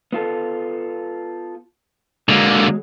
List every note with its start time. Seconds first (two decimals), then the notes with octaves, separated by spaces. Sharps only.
0.13 B3 F4 A4
2.29 D3 F#3 G#3 A#3